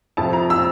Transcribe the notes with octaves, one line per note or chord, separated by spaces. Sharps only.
F2 C3 F3 A5
A#5
E6